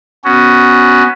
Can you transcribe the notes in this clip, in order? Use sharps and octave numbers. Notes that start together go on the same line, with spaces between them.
B3 C#4 F#4